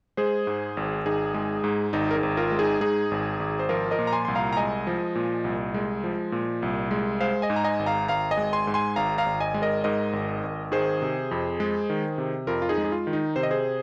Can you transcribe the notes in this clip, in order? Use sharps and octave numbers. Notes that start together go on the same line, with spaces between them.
G#3 G#4 C5
G#2
G#1
G#1 D#4 G#4
G#3
G#2
G#1 D#4
A#4
D#4 G#4
G#1
F4 A#4
G#3
D#4 G#4
G#2 D#4 G#4
G#1
G#1
C5
F3 F4 A#4
A#4 D#5
A#2
A#5
G#5 C6
C2 C6
F5 A#5
A#5
G#3 D#5 G#5
F3
A#2
C2
G#3
F3
A#2
C2
G#3
G#3 C5 F5
D#5 G#5
G#2
A#5
D#5 G#5
G#1
F5 A#5
G#1 F5 A#5
D#5 G#5
G#3
G#5 C6
G#2
G#5 C6
G#1 F5 A#5
F5 A#5
G#1
D#5 G#5
G#3
A#4 D#5
G#2 A#4 D#5
G#1
G#1
D#3 G#4 C5
C3
F2
G#3
D#3
C3
F2 F4 A#4
F4
D#4 G#4
G#3
G#4
F4
D#3
D#4
C3 C5
D#5
G#4 C5